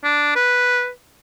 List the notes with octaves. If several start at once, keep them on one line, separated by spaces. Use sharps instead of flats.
D4
B4